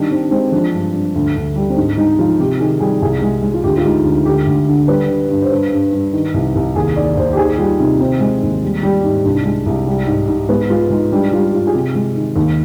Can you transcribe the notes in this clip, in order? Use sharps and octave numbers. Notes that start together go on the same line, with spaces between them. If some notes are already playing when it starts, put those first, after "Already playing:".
Already playing: D#3 G3 D4
D#3 C4
G#3 C4
F3 D4
G2
G2
D2
D2
G3
C4
G#2 D4
G#3 D#4
F3 F4
C3 G4
D#3 G#4
G3 G#4
C2 G#4
G#3
G#3
F4
D2 G4
F4
G#3 D#4
D2
D3 G4
D2
D3
G3 B4
D3
G2
C5
G2 B4
G2
G2
D#3
C2
C2
D#2 G#4
D#2 D5
D#2 C5
G4
D#3 G#4
G3 F4
C3 D#4
D#3 C4
G#3
D#2
G3
G3
G#2
C2 D4
G#3
C2
G3
G#2
G#2
G#3 B3
G#3 F4
G#3 D#4
G3 D4
G3 F4
G2 F4
G#4
C3 G4
G#3
D#3
D#2